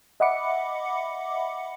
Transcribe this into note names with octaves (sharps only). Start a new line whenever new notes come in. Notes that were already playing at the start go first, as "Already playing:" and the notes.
D#5 E5 F#5 B5 D6 C#7